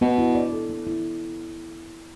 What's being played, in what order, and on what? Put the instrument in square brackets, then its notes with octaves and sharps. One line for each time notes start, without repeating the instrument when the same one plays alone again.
[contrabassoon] B2 [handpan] B3
[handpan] E4
D5
A4
B3
E4